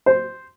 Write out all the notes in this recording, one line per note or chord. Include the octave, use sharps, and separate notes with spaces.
C5